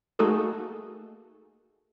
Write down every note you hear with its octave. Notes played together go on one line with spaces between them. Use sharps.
A3 A#3 D#4 F#4 G#4 A4